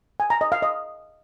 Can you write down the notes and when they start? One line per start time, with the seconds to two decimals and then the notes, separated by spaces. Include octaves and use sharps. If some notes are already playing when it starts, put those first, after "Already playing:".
0.20 G#5
0.30 A#5
0.41 D#5
0.52 F5
0.62 D#5